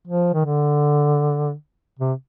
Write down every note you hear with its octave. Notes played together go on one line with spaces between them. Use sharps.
F3
D#3
D3
C3